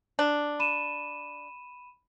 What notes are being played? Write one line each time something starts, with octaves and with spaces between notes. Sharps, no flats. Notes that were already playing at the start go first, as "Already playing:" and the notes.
D4
B5 D#7 E7